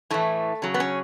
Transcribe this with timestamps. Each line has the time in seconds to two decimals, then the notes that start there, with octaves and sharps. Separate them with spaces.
0.10 A2 E3 A3
0.62 C#3 F#3
0.74 B3
0.80 C#4